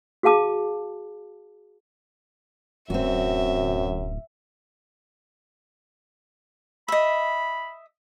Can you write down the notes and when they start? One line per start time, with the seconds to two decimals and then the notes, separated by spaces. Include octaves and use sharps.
0.23 F#4 G#4 F5 A5 D6
2.90 D1 F#2 C4 F#4 E5
6.88 D#5 E5 B5